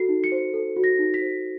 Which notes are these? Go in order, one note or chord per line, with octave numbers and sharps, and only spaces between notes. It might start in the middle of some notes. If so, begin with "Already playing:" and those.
Already playing: F#4 A4 C7
D#4
C#7
C5
A4
F#4
A#6
D#4
B6
C5